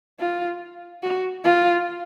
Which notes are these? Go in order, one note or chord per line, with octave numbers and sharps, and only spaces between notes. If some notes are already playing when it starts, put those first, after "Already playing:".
F4
F#4
F4